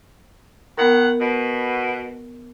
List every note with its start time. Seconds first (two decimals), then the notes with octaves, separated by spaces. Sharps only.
0.78 D#3 B3 A#4 F#5
1.20 B2